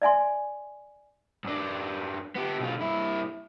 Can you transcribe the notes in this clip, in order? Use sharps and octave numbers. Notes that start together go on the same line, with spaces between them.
D5 E5 G#5 C6
F#2 D4
B3 G4
B1 F4
G2 E4